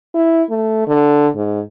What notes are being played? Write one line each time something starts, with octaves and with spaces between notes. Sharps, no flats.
E4
A3
D3
G#2